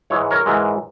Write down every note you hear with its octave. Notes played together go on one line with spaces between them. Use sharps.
G#2 E3 G#3 C#5
A#4 C#5
G#2 E3 G#3